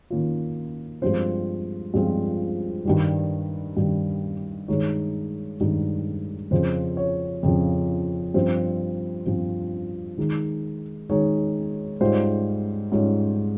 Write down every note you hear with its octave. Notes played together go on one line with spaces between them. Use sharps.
D#3 A#3 C#4 F4
G2 F3 G#3 C4 F4 C5
G2 F3 G#3 C4 F4
G2 D#3 G3
G2 D#3 G3
G2 D#3 G#3 D#4 C#5
G2 D#3 G#3 D#4
F2 C#3 F3 C5
C#5
F2 C#3 F3
G2 F3 C4 C5
G2 F3 C4
D#3 G#3 D#4
D#3 G#3 D#4 C#5
G#2 G3 C#4 F4 C5
G#2 G3 C#4 F4